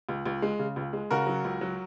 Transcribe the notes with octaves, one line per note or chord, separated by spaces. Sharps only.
C#2
C#2
G#3
C#3
C#2
G#3
C#3 F#4 A#4
F#3
C#2
F#3